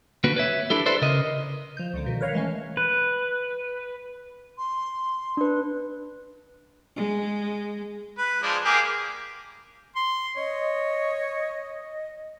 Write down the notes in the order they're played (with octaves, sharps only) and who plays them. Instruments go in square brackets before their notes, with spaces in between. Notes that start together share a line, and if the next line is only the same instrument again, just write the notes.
[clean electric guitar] D3 A#3 F#4 B4
B4 C#5 E5
D4 E4 G4 A4
G4 A4 B4 C5 D5 E5
C#3 A#4 D#5
[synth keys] F3 G6
C#2 D3 A#3
B2 D#3
A#4 B4 C#5 F5
E3 G#3 A3 C#4
[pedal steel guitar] B4
[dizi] C6
[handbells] D4 B4
[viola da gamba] G#3
[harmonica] B4
F3 G#3 D4
A#3 G4 G#4
[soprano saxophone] C6
[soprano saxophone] C#5 [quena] D#5